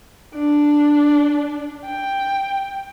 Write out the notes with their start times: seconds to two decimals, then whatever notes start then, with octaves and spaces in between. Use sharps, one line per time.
0.35 D4
1.86 G5